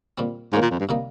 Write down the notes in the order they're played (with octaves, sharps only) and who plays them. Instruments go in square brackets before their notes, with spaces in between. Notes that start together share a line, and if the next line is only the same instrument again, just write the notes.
[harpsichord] A#2 G3 C4
[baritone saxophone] G#2 [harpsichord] D#3 A#3 C#4 F4
[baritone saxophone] A#2
F2
G2
[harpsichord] C3 G3 A#3 D#4